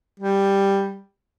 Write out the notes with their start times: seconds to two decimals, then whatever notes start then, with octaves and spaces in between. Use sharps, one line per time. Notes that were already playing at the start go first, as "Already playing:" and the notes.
0.20 G3